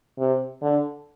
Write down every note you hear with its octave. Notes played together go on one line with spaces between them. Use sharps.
C3
D3